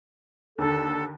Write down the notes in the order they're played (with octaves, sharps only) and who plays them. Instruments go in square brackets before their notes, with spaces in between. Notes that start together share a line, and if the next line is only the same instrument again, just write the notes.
[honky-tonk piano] D#2 D3 [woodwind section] A4